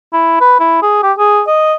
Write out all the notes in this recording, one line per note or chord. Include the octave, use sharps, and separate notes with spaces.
E4
B4
E4
G#4
G4
G#4
D#5